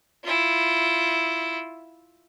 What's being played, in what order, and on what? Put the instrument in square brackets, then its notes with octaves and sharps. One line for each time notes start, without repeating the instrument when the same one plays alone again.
[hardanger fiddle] E4 F4